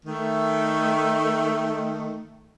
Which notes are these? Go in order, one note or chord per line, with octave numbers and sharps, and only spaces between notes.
D#3 A3